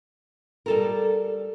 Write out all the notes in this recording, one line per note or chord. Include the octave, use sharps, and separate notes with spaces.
G3 A4 A#4